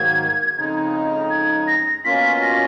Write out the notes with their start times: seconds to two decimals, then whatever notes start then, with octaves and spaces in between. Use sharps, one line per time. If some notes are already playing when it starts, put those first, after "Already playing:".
Already playing: G#2 D#3 F#3 A#3 G#6
0.57 F2 C#3 G#3 D#4
1.30 G#6
1.67 A#6
2.05 B2 A#3 C#4 F4 B6
2.42 A#6